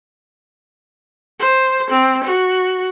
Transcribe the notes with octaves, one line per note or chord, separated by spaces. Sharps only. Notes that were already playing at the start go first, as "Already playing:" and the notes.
C5
C4
F#4